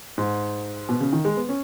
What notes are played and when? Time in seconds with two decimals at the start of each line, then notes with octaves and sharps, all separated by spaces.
0.18 G#2
0.89 B2
1.01 C#3
1.13 D#3
1.25 G#3
1.37 B3
1.49 C#4